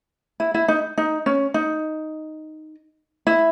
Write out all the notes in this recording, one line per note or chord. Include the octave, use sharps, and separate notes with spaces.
E4
E4
D#4
D#4
C#4
D#4
E4